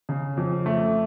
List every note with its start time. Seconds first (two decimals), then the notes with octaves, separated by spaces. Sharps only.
0.09 C#3
0.37 F2
0.66 A3